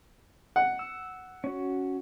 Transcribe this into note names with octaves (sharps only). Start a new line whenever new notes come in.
F#5
E6
C#4 F#4